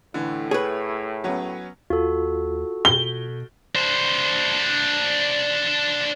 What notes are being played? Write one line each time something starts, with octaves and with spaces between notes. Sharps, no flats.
A2 D3 E3
G#4 B4 C#5
F#3 B3 C#4
D#2 F4 F#4 A4
B2 G7
D4 C5